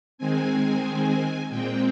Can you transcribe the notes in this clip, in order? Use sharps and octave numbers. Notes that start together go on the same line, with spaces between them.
D#3 G#3 C4 G#5
A#2 G#3 C4 G5